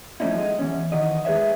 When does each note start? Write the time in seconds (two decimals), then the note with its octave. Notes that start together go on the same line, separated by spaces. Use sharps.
0.20 F3 A3 C#4 D#4 E4
0.36 F#3 G#3 D#5
0.59 E2 C#4
0.92 D#3 E3 F#4 D#5
1.25 G#3 G#4 B4 C#5 E5